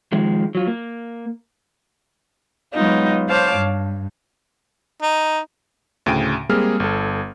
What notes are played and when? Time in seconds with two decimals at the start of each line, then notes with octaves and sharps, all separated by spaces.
0.12 D#3 F3 G#3
0.55 F#3 F4
0.67 A#3
2.74 F#3 G#3 B3 D#4 F4
3.29 C5 C#5 F5 A5 D6
3.57 G2
5.02 D#4
6.06 D2 A2 C#3 G5 D7 D#7
6.49 G3 G#3 A#3 C4 G#4 F6
6.80 G1 A4